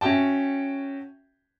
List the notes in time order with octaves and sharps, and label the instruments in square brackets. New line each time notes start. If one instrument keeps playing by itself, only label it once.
[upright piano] C#4 F#4 E5 G5 A5